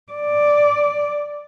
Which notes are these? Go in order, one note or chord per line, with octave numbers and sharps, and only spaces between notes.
D5